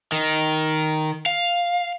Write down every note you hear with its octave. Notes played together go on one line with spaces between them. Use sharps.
D#3
F5